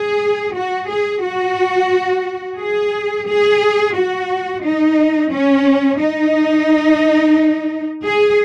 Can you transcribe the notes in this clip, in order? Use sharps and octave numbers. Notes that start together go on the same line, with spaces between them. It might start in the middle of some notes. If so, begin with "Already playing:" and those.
Already playing: G#4
F#4
G#4
F#4
G#4
G#4
F#4
D#4
C#4
D#4
G#4